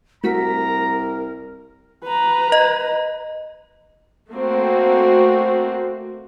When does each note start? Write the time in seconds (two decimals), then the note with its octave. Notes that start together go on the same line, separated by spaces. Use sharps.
0.24 C2 A3 F#4 A#4 A#5 B6
2.04 B4 A#5
2.52 D#5
4.31 A3 A#3 C4 F#4